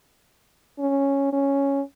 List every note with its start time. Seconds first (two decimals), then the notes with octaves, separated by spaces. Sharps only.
0.79 C#4
1.33 C#4